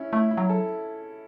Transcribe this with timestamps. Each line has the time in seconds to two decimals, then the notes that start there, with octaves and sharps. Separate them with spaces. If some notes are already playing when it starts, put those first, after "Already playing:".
Already playing: C#4 E4
0.13 A3 E4
0.31 E4
0.38 F#3
0.49 A4